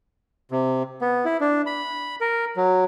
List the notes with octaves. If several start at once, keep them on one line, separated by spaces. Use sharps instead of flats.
C3
B3
E4
D4
B5
A#4
F#3